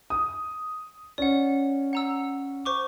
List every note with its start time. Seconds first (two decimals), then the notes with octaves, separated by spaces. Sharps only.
0.10 D#6
1.18 C#4 D5 F#5
1.93 F#5 A#5 E6
2.65 C5 C#6 D6